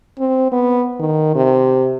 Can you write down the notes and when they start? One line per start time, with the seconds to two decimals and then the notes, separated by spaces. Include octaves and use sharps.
0.19 C4
0.52 B3
1.00 D#3
1.36 C3